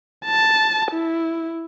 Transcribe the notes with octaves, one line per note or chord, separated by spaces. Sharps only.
A5
E4